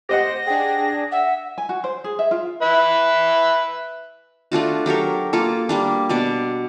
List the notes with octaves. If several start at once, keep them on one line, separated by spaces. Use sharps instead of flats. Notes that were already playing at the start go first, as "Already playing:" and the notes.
G4 C5 D#5 F#5 A#6
D4 G#4 G5
E5 F#5
G#5
F#4
C5
G#4
E5
F4
B4 E5
A3 D4 F4 F#4
F#3 G4 A4 A#4
A#3 F4 A4
G3 A#3 D4
B2 D4 D5